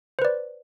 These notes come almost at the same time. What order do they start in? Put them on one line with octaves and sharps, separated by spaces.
C5 B4 D5